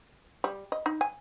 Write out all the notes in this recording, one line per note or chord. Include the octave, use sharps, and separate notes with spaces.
G3
D#5
D#4
G#5